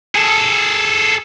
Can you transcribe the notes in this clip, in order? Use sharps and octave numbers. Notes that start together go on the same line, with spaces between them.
G#4 A4